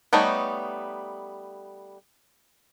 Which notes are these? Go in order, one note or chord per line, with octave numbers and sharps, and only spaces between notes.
G3 A3 B3 D#4 C#5